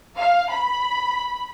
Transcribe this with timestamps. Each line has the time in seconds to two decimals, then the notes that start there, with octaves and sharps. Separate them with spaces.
0.15 F5
0.50 B5